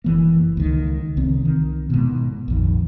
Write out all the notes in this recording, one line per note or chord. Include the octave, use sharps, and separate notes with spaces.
F#1 E3 A#3
C#2 D#3
C2 D#3 C4
D#3
G#2 B2
A#1 F2 D#3